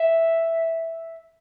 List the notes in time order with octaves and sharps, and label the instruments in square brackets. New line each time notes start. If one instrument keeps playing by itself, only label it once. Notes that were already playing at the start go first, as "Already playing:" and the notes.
Already playing: [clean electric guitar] E5